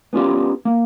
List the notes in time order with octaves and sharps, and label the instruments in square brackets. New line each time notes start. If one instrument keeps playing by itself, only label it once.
[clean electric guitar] B3 C#4 D4 F4 G4
A#3